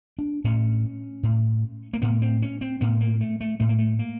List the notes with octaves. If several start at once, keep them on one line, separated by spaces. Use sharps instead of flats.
D4
A2 C#4
A2
A#3
A2 B3
C4
C#4
C4
A2 B3
A#3
A3
A3
A2 A3
A#3
A3
A#3